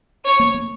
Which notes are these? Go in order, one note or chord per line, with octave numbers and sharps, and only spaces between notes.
C#5
A#3
A#3